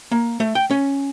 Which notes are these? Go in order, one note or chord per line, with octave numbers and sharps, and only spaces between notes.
A#3
A3
G5
C#4